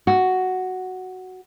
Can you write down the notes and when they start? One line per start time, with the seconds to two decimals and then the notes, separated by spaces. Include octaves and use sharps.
0.07 F#4